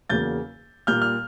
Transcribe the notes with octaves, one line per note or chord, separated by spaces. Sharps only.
E2 C#3 F#3 A#3 G6 A6
A#2 G3 A#3 F6 G6
F6